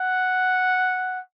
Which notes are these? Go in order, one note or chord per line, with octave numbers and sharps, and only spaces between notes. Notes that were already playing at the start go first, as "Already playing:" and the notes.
Already playing: F#5